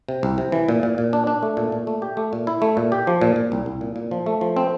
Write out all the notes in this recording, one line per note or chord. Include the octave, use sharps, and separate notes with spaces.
C3
C2
C3
E3
A#2
A#2
A#2
D4
D4
A3
A#2
A#2
A3
G4
A3
A#2
E4
A3
A#2
G4
F3
A#2
A#2
C2
C2
A#2
A#2
F3
A3
F3
C4